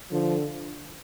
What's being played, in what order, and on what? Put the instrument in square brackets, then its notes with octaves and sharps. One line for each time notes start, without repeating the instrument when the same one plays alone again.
[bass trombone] D3 [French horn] F3